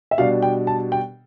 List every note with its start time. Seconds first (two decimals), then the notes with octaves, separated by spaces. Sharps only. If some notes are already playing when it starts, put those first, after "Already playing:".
0.11 E5
0.18 B2 G3 D4 F5
0.42 G5
0.67 A5
0.92 G5